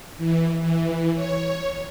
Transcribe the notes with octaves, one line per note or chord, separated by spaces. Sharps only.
E3
E3
C#5